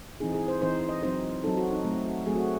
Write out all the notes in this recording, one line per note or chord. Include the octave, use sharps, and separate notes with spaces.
E3 C4 D#4 G#4
G#4
C5
E3 C4 D#4 C5
D#5
F#3 C4 D#4 C5
F#3 C4 D#4 A4
F#4
D#4
F#3 A3 C4
F#4
F#3 A3 C4 G#4
F#4